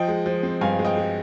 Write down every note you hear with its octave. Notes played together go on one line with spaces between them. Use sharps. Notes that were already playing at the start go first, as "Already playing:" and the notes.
Already playing: F3 D#5 G5
G#3
F3
C4
G2 F5 G#5
G#3
D#5 G5
G#3